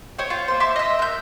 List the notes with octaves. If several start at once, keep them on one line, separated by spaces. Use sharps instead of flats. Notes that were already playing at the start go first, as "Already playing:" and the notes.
C5 C#5 G5
F4
A#3 C5
E5 C6 D6
D#5 E5
A#4 G6